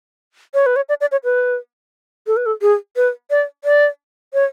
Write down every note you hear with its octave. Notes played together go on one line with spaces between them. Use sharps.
C#5
B4
C#5
D5
D5
C#5
B4
A4
B4
A4
G#4
B4
D5
D5
C#5